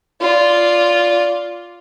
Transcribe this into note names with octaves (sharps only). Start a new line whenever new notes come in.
F4 D5